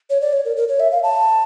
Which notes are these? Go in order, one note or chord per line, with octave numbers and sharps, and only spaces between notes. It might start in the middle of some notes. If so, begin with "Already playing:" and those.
C#5
D5
C#5
A#4
A#4
C#5
E5
F5
A5